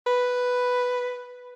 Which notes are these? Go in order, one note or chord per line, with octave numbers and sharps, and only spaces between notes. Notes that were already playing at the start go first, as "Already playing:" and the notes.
B4